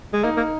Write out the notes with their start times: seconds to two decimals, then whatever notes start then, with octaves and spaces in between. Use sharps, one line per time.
0.13 G#3
0.24 A#3 D#4
0.37 A#3